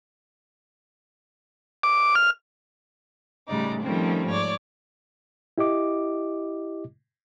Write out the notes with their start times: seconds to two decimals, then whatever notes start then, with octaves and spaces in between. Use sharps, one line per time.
1.83 D6
2.15 F6
3.48 A2 C#3 G3 G#3 D#4 D5
3.82 D#3 F3 G3 A3 C4 C#4
4.27 G#2 C#5 D5
5.58 E4 G4 D#5 D6